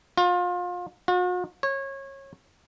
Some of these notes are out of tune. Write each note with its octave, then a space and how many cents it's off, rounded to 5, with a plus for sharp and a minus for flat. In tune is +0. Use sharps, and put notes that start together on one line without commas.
F4 +30
F#4 -45
C#5 -25